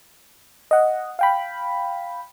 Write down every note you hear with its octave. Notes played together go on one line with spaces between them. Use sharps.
D#5 F#5
F5 G5 B5